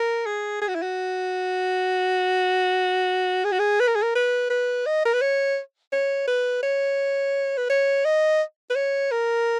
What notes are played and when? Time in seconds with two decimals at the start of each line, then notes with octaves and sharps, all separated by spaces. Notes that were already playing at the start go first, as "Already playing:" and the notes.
Already playing: A#4
0.26 G#4
0.61 G#4
0.68 F#4
0.75 E4
0.82 F#4
3.44 G#4
3.52 F#4
3.59 G#4
3.80 B4
3.87 A#4
3.95 G#4
4.02 A#4
4.15 B4
4.50 B4
4.86 D#5
5.05 A#4
5.13 B4
5.22 C#5
5.92 C#5
6.27 B4
6.63 C#5
7.57 B4
7.69 C#5
8.05 D#5
8.70 B4
8.75 C#5
9.11 A#4